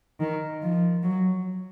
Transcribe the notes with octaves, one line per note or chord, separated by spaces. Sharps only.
D#3
F3
F#3